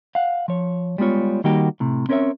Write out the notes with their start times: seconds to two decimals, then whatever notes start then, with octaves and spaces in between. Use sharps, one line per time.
0.15 F5 F#5
0.48 F3 C#5
0.98 G3 G#3 B3 F4 C#5
1.44 D#3 G3 A#3 D#4 F#4 G4
1.80 A2 C3
2.09 C4 C#4 A#4 C5 C#5 E5